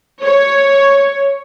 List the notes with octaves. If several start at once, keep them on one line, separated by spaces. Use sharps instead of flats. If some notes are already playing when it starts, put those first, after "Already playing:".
C#5